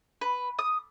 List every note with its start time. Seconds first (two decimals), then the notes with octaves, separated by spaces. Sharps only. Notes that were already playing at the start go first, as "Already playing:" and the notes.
0.21 B4
0.59 D#6